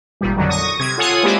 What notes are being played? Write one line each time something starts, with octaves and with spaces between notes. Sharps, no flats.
G#1 A#2 G3
F2 D3 D#3 F#3
C#6 D#6 A#6
C3 G#6
F4 A4 C#5 F#5 G#5 D#6
G#3 A#3 C4 E4 G4 D5